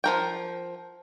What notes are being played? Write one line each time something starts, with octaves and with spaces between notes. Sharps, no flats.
F3 A#4 G5